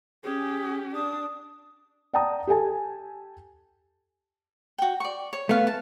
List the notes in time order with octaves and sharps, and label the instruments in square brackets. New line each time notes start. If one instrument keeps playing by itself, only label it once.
[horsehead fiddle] C#4 G4 [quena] G#4
[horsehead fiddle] D4 [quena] D#6
[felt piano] D5 F#5 G5 A5 A#5 D#6
G4 A4 G#5 A5
[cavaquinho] F#4 G5
D5 C#6
C#5
[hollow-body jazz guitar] A3 B3 [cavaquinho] C#5 F5
[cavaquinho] A5